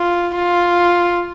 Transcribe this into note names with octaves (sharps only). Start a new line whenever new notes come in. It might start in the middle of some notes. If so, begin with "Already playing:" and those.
Already playing: F4
F4